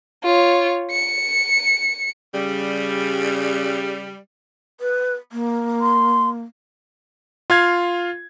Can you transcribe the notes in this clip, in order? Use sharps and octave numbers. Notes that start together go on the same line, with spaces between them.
F4 C#5
C#7
C#3 G3
B4
A#3
C6
F4 F5 G#6